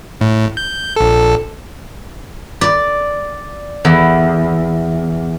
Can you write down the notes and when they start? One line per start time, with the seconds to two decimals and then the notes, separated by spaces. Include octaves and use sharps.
0.21 A2
0.57 G6
0.96 A#1 A4
2.61 D5
3.85 E2